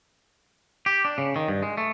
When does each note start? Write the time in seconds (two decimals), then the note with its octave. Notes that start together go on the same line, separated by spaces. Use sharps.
0.86 G4
1.05 D4
1.18 C#3
1.36 D#3
1.48 G2
1.63 G#3
1.77 A3